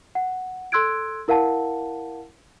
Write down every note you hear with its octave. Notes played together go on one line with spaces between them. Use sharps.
F#5
A4 C6 E6 F#6 G#6 D7
E4 A#4 F5 F#5 A5